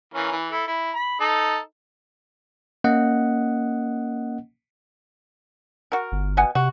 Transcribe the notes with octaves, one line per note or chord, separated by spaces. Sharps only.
E3 A#3 C#4
E3
E4 A4
E4
B5
D#4 A4 A5
A#3 C#4 D#5 F#5
F#4 A#4
G1
B2 F#5 G#5
C3 F#4